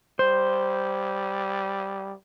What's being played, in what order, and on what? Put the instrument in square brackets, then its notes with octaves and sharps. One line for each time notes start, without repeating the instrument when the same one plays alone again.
[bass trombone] G3 [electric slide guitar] C5